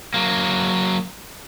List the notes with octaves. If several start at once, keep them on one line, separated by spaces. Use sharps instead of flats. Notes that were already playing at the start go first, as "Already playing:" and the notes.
F#3 A#3